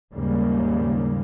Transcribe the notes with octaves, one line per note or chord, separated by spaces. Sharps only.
D#2 G#2 C#3 G3 A#3